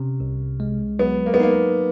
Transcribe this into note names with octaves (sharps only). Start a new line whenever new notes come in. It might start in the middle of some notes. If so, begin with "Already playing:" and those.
Already playing: C3 C#4
C2
G#3
F#3 B3
A#3
B3
A#3 D#4
A#3